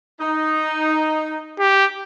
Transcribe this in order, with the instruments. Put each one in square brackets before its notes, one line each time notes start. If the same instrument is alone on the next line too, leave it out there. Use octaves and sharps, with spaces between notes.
[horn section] D#4
[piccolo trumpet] G4